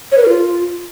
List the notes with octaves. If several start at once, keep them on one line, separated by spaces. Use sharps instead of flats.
C#5
B4
A#4
F4